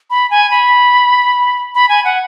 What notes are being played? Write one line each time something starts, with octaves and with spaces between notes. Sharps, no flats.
B5
G#5
B5
B5
G#5
F#5